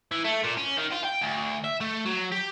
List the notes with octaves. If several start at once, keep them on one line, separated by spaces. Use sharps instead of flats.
E3
A3
A#2
C#4
D#3
F4
G5
D2
E5
A3
F#3
G4